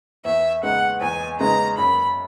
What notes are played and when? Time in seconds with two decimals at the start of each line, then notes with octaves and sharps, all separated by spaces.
0.25 E2 E5
0.63 C#3 G#3 B3 D#4 F#5
1.01 E2 G#5
1.40 C#3 G#3 B3 D#4 A#5
1.77 F#2 B5